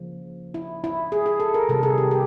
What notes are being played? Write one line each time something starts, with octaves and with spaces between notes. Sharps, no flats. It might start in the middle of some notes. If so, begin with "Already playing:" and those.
Already playing: C#3 F3 A#3
E4
E4
G#4
G#4
A4
A#4
C3 D#3 G3 A4
G#4
G4
G4